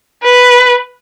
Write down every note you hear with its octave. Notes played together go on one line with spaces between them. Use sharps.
B4